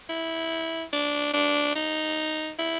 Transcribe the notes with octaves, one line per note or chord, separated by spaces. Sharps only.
E4
D4
D4
D#4
E4